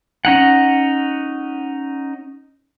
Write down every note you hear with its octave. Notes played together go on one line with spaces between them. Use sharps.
C#4 D#4 F#5